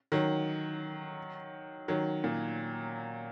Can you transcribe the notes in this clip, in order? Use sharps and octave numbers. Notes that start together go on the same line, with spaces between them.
D#3 F#3
D#3 F#3
A#2